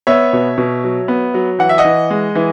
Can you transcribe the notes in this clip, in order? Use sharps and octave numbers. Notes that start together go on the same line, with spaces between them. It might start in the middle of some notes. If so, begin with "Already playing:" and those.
B3 C#5 E5
B2
B2
F#3
B3
F#3
E3 F#5
E5
D#5 F#5
E3
G#3
E3